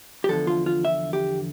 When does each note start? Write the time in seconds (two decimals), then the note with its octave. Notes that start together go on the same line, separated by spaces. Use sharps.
0.24 G4
0.29 E2 D3 F3 A4
0.47 F4
0.66 F4
0.85 E5
1.13 G4